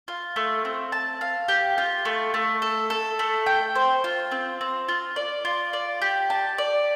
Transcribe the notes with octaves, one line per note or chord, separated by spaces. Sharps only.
F4
A3
C4
A5
F5
G4
F4
A3
A3
A4
A4
A3
G5
C5
F4
C4
C4
F4
D5
F4
D5
G4
A5
D5